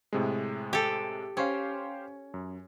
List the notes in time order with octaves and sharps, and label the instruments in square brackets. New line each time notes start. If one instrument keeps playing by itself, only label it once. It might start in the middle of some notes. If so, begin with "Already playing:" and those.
[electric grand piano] A2 C3 G#3
[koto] G4 A4
[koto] C#4 [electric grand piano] G4 C5 F5
[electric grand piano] F#2